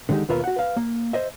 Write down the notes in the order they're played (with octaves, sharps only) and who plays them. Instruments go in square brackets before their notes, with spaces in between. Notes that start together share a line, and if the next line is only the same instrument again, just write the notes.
[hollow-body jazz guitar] D3 D#3 G#3 D#4 G4
D#2 B2 F4 A#4 B4 E5
F#4 F#5
B4 F5
A#3
C5 D#5 E5